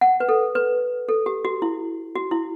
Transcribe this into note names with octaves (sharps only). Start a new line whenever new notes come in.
F#5
B4
A4
B4
A4
G4
F#4
E4
F#4
E4